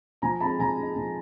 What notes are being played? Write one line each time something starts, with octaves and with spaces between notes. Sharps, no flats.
F3 G#5 A#5
G#3 C4 D#4 A5 B5
F3 G#5 A#5
G#3 C4 D#4
F3